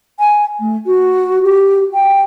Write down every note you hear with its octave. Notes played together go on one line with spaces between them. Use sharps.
G#5
A3
F#4
G4
G5